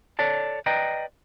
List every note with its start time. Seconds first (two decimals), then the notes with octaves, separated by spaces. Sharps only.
0.19 A4 C#5 D5 A5
0.66 B4 D5 D#5 G5 A#5